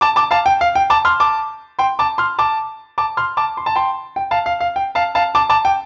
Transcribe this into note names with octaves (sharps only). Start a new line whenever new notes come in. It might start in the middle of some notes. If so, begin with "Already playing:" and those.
A5 D6
A5 D6
F5 A5
G5
F5
G5
A5 D6
C6 F6
A5 D6
G5 C6
A5 D6
C6 F6
A5 D6
A5 D6
C6 F6
A5 D6
C6
A5
G5 C6
G5
F5 A5
F5
F5
G5
F5 A5
F5 A5
A5 D6
A5 D6
G5